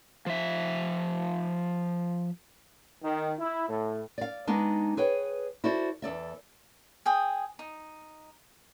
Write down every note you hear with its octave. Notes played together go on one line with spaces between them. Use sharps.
F3 E5
D#3
E4
A2
D5 F5
G#3 B3 D4 D#4
G#4 B4 C#5 G5
E4 F#4 A4 C5 D5
E2 A4 D5 E5
G#4 G5 D#6
D#4